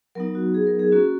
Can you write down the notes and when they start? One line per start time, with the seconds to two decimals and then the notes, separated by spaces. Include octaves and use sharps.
0.15 F#3 B3 D#4 A#4
0.35 F#4
0.54 G#4
0.67 A#4
0.79 G#4
0.92 A#3 C#4 F#4